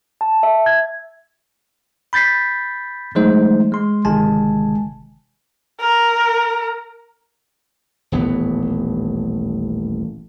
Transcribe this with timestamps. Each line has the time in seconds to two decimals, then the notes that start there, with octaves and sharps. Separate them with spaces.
0.21 A5
0.43 E5
0.66 G#6
2.13 B5 G6 A6 B6 C7
3.15 E3 F#3 G#3 A3 D#4 C5
3.72 G#3 C6
4.05 G1 C3 D#3 G#3 G#5 A5
5.80 A#4
8.12 D#1 A1 E3 B3